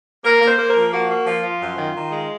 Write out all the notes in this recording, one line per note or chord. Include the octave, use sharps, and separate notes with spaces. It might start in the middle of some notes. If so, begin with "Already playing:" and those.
A#3 A#4
A#3
C5
A#3
A#4
F3
A#3 F#4
A#3
F3 F4
F3
F#2
D#3
D#3
G#3